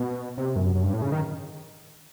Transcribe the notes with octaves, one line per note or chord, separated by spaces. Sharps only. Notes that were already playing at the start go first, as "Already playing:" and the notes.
Already playing: B2
C3
F#2
F#2
G2
A2
C#3
D#3